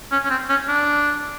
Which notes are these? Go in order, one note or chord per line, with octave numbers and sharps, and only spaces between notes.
C#4
C#4
C4
C#4
D4